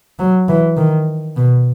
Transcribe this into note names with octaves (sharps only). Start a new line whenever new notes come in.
F#3
E3
D#3
B2